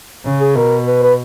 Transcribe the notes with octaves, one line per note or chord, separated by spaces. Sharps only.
C#3
G#4
B2 A#4
B4
B4